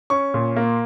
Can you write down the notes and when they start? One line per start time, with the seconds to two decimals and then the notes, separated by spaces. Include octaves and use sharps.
0.10 C#4 C#6
0.34 A#2
0.56 A#3